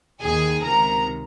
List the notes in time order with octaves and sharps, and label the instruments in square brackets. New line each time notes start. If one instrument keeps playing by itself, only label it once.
[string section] D#2 D#3 G#4 G#5
C#2 C3 D#3 A#4 A#5